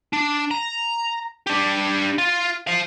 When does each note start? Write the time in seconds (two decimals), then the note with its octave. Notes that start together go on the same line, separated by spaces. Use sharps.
0.13 D4
0.51 A#5
1.47 D4 G4
2.18 F4
2.67 C5 F5